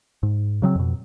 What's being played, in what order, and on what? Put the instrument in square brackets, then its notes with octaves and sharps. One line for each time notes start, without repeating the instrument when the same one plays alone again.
[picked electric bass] G#2
C#3 F#3 G#3 C4
F2 B2